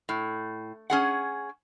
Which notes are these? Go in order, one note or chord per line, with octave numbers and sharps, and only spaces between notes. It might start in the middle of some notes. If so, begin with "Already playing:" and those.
A2
C#4 G#4 F#5